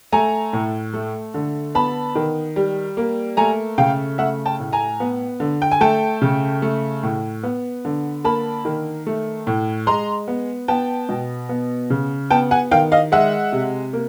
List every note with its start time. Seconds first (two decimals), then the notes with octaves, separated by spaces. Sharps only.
0.12 A3 G#5 A#5
0.53 A2
0.94 A3
1.34 D3
1.75 B3 A5 B5
2.15 D#3
2.56 G3
2.97 A#3
3.37 A3 G#5 A#5
3.78 C#3 F5 G5
4.18 A3 E5 F#5
4.46 G5 A5
4.59 A2
4.73 G#5 A#5
5.00 B3
5.40 D3
5.62 G5
5.72 G#5
5.81 A3 G5 A5
6.22 C#3
6.62 A3
7.03 A2
7.43 B3
7.85 D3
8.24 A#3 A5 B5
8.65 D#3
9.07 A3
9.47 A2
9.87 G#3 A#5 C6
10.28 B3
10.68 B3 G5 A5
11.09 B2
11.49 B3
11.90 C#3
12.30 B3 G5 A5
12.51 F#5 G#5
12.71 D#3 F5 G5
12.92 D#5 F5
13.12 G#3 E5 F#5
13.52 C3
13.93 A#3